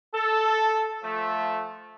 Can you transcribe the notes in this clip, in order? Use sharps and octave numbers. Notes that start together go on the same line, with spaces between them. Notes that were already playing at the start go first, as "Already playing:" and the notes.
A4
F3 A3